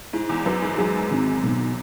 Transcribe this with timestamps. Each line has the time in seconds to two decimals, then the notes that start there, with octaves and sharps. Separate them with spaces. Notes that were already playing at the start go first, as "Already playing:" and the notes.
0.13 G#2 E4
0.29 E2
0.45 F#2 B4
0.62 G#2
0.78 F#2 G#3
1.11 G#1
1.43 B1